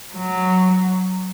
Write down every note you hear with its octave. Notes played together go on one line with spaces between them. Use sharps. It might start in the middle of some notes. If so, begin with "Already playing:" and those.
F#3